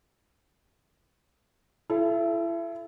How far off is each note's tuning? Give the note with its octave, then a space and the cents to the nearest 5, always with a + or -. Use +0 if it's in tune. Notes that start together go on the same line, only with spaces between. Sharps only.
E4 +30 A4 -25